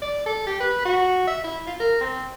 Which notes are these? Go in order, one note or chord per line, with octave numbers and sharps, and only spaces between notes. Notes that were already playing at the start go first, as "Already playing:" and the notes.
D5
A4
G4
B4
F#4
E5
E4
F4
A#4
C4